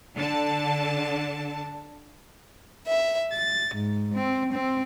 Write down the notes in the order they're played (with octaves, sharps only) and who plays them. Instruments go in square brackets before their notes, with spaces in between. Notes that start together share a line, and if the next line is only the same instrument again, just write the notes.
[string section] D3 A5
[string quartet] E5
A6
G#2
C4
C4